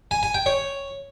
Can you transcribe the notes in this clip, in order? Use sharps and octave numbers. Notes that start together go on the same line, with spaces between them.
G#5
G#5
G5
C#5